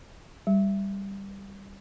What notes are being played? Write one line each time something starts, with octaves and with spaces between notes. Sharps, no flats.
G3